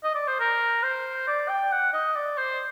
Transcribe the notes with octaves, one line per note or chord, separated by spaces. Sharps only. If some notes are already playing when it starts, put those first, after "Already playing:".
D#5
D5
C5
A#4
C5
D5
G5
F#5
D#5
D5
C5